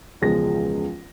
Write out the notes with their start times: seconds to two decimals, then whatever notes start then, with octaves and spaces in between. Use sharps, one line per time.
0.21 E1 C#2 F3 G#3 A#6